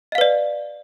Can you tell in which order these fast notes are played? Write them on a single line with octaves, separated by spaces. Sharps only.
D#5 F5 B4 D5